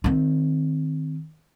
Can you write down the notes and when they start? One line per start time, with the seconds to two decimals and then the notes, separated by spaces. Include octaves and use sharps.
0.04 D#3 C4